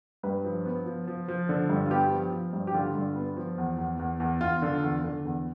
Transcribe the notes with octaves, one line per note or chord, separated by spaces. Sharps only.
G2 B4
F3
B3
F3
F3
F3
D3
G2
F4
B3 G4
F3
F3
G2
G4
D3 F4
G2
B3
F3
E2
E2
E2
E2
E2 F4
D3
E2
D3
E2